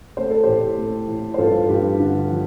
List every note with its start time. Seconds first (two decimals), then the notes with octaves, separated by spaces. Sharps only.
0.17 A3 C5
0.30 A4
0.44 A2 G4 C5
0.78 A3
1.08 A2
1.34 C5
1.38 G2 F4 A4
1.69 G2 G4
1.99 D3
2.30 F3